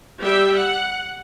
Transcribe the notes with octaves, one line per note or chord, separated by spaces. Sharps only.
G3 G4 E5 G5
F#5